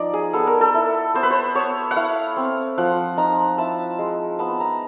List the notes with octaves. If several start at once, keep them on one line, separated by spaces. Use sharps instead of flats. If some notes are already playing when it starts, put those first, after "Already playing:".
Already playing: F3 D#4 D5
G#4
B3 A4
A#4
A4
E4
B3 C5
B4
C5
B3 C#5
F#5
E4 F5
C4
F3 F#5
D#4 A#5
E4 A5
G#3
B3 A5
A#5